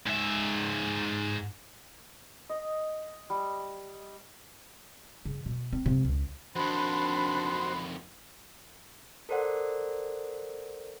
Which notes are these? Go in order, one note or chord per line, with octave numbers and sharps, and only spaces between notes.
G#2 E5
D#5
G3
C#3
B2
C4
C3
C#2
F2 D#3 D4 F#4 C5 B5
A4 A#4 C5 D5 F#5